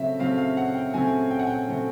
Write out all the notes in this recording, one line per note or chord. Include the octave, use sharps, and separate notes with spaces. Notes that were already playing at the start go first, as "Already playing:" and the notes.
Already playing: C#3 F#3 A3 C4 E5
C#3 F#3 A3 C4 F5
F5
F#5
G5
C#3 F#3 A3 C4 G#5
G5
F#5
G5
C#3 F#3 A3 C4